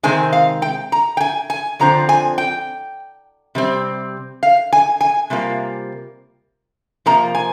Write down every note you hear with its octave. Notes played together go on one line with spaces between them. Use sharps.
C3 D#3 G#3 C4 G#5
F5
G5
A#5
G5
G#5
G#5
F2 D3 F3 C4 A#5
G#5
G5
C3 G3 C4
F5
G#5
G#5
C3 G3 A#3 F4
C3 F3 A#3 A#5
G#5